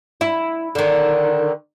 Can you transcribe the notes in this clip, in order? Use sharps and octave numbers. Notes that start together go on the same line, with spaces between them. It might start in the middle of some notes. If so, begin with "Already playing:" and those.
E4
D3 D#3